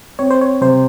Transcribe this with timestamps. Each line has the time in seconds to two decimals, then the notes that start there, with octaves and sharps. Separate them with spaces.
0.19 C4 C#5
0.30 C5
0.41 C#5
0.61 C3 C5